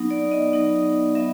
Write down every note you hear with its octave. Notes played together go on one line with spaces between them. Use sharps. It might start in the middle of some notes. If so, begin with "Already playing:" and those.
Already playing: F#3 B3 D#4
D5
D#5
F#3 B3 D#4
F#3 B3 E5